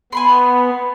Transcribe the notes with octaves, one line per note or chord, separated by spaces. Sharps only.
B3 G#5 B5 C6